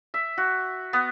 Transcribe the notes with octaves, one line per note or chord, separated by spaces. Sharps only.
E5
F#4
B3